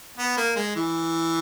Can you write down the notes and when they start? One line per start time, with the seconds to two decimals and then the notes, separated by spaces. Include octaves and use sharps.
0.18 B3
0.37 A#3
0.56 G#3
0.76 E3